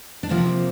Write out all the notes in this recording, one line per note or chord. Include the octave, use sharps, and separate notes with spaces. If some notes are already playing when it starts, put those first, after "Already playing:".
D4
C3 F3 A#3 C4